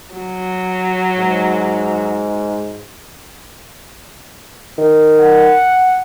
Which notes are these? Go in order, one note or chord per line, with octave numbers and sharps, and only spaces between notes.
F#3
G#2
D#3
F#5